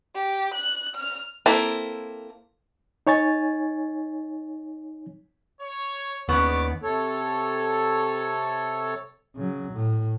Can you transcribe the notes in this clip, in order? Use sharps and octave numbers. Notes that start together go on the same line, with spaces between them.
G4
F#6
F6
A#3 C4 E4 A4
D#4 C#5 G#5 A6
C#5
D#2 B3 C#4 G#4 C#5 D5 C#6
C3 A4 C#5
C#3 F#3
A2